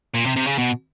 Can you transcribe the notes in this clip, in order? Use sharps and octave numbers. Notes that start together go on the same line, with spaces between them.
A#2
C3
C3
C#3
B2